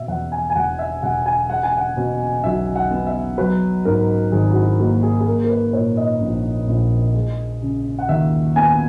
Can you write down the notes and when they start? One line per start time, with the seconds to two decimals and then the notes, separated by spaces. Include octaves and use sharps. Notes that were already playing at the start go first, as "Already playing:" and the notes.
Already playing: B2 E5
0.08 E2 F#5
0.32 G#5
0.50 G#5
0.55 E1 F#5
0.79 E5
1.02 E1 F#5
1.26 G#5
1.50 G#3 F#5
1.63 G#5
1.77 F#5
1.97 B2
2.44 B1 E5
2.76 F#5
2.91 B3
3.07 E5
3.38 F#3 B4
3.85 G#2 A#4
4.32 G#1 G#4
4.52 F#4
4.56 E4
4.79 A#3 F#4
5.03 G#4
5.20 G#4
5.26 A#3 A#4
5.44 A#4
5.50 B4
5.73 A#2 C#5
5.97 D#5
6.21 A#1
6.67 A#1
7.15 G#3
7.62 C#3
7.99 F#5
8.09 D#2 E5
8.56 B3 G#5